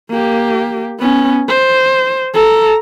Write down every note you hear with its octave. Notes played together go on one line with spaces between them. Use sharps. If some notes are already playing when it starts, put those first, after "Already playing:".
A#3 G4
B3 C#4
C5
A4 A#5